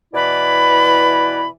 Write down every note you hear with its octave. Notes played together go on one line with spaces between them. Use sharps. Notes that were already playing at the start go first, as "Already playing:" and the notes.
B2 E3 E4 B4 D5 B5